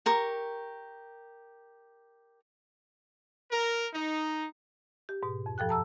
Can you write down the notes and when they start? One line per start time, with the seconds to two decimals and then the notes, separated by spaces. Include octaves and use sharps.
0.06 G4 A#4 C#6
3.52 A#4
3.94 D#4
5.09 G4
5.23 G#2 B2
5.46 F2
5.58 G2 F3 A4 G5 F#6
5.69 A5 A#5 E6